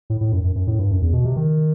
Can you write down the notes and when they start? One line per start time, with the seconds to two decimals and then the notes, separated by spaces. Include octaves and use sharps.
0.10 A2
0.21 A2
0.32 F#2
0.44 F#2
0.56 F#2
0.67 A2
0.79 G2
0.91 F#2
1.02 E2
1.13 B2
1.25 C3
1.36 D#3